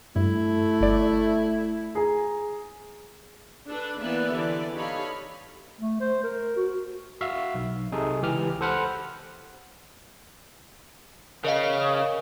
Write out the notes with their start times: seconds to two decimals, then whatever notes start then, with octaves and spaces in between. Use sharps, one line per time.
0.16 G2 A3 E4
0.81 G1 D5
1.95 G#4 A#5
3.67 D4 A4 B4
3.98 E3 A#3 B3 B4 D5 E5
4.33 D3 E3 G4 D5
4.76 D#4 G4 A4 C#5 F5 B5
5.81 A3
6.00 C5
6.24 A#4
6.57 F#4
7.21 F#4 E5 F5
7.54 B1
7.92 C3 D#4 G#4 A4
8.22 C#2 E3 G4 F6
8.61 A4 C5 F#5 B5 F6
11.44 C#3 A#4 D#5 F5